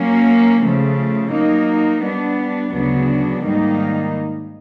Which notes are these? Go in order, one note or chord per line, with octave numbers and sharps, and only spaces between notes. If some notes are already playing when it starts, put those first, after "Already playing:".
Already playing: F#3 A#3 C#4
C#3 F3 A3
F#3 A#3 D#4
G3 B3 D4
D2 C#3 F#3 B3 D4
G#2 D#3 G3 A#3 D#4